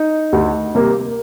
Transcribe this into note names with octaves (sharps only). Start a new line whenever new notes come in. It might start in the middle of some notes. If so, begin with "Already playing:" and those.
Already playing: D#4
D2
C3 G3 A#3